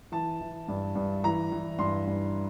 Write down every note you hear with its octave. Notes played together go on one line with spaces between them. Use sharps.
E3 A5
E3
G2
G2
E3 A#5
E3
G2 C6
G2